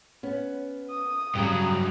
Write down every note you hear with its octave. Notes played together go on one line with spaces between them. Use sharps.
B3 C#4
D#6
G2 C#3 F#3 G4 G5